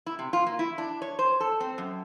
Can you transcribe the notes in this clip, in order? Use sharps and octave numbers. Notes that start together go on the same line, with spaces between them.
E4
C3
F4
A#3
E4
D4
C#5
C5
A4
C4
F#2